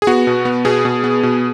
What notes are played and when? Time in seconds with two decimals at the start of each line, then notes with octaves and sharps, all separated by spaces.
0.02 G#4
0.07 B3 F#4
0.27 B2
0.45 B3
0.65 B2 G#4
0.85 B2
1.04 B3
1.23 B2